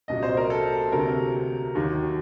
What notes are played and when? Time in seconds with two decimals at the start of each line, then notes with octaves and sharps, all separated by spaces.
0.08 C2 A#2 F#3 D#5
0.23 C5
0.37 A#4
0.50 A4
0.92 D2 C3 F#3 A#4
1.75 D#2 D#3 F#3